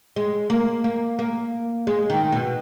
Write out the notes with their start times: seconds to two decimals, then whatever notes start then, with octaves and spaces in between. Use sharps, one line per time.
0.16 G#3
0.50 A#3
0.84 A#3
1.19 A#3
1.87 G#3
2.10 D#3
2.32 B2